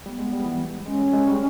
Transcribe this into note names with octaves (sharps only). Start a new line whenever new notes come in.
G3 B3
G#3
G3
E3
G#3 C#4
G3
G#3
G3